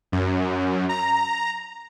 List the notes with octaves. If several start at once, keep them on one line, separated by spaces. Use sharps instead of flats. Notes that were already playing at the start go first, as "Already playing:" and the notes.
F#2
A#5